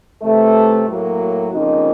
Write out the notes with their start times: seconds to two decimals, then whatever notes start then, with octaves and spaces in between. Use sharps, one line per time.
0.22 C3 E3 A3
0.87 A2 F#3 A#3
1.52 F2 C#3 F3 A#3 D#4